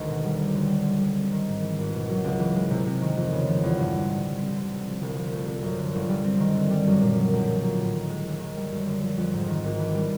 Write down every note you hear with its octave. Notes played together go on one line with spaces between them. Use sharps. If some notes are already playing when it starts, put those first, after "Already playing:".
Already playing: D2 D#3 G#3
B2
G3
B1
D3
G3
D2
G3
C4
D#3
G#2
E3
G#1
B2
F#3
C#2
E3
G#3
C3
C3
D#3
F2
C#3
F3
E2
G2
D3
A1
G3
C4
D3
C3
F3
C2
F3
A3
C3
F#2
D3
G1
G3
C4
D#3
D3
G3
F#2
A#2
F#3
B1
F3
A#3
A2
D#3
G#3
D#2
D#3
G3
F#2
D3
F3
F2
G#2
D#3
G#1
E3
G3